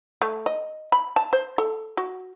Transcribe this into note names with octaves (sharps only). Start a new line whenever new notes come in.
A3
D#5
B5
A5
C5
A4
F#4